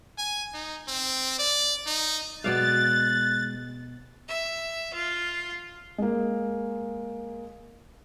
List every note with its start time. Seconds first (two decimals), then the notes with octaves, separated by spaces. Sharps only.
0.18 G#5
0.54 D#4
0.88 C4
1.39 D5
1.86 D#4
2.44 B2 G#3 D5 F5 F#6 A6
4.28 E5
4.94 F4
5.98 G#3 A#3